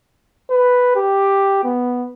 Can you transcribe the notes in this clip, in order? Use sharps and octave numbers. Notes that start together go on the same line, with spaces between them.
B4
G4
B3